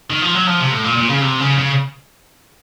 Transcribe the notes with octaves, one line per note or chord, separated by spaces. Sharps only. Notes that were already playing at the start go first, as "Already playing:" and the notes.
D#3
F3
F#3
F3
C3
A2
A#2
A#2
C#3
C3
C#3
C#3